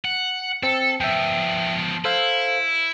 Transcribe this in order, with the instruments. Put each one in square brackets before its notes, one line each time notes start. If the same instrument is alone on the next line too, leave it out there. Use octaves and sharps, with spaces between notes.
[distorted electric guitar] F#5
[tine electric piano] C4 [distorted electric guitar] A4
[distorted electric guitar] F3 B3 [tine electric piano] E5 G5
[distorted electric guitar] E4 [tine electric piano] A4 C5 F5